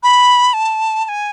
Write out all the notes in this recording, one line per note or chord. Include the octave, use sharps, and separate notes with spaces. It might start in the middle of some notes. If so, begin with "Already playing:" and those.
B5
A5
A5
G#5